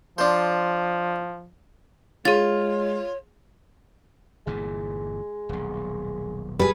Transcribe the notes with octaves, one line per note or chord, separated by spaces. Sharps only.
F3 D4 C5
G#3 F4 G#4 C#5 A6
G1 A#2 E3 G#3
D#1 B1
G3 G#4 B4